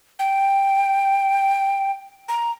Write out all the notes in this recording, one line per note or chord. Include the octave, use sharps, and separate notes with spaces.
G5
A#5